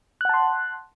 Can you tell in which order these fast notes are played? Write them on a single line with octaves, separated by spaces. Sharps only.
F#6 F#5 A5 C6